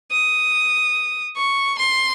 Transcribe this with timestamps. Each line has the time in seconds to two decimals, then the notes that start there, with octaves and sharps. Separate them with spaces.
0.12 D#6
1.37 C#6
1.78 C6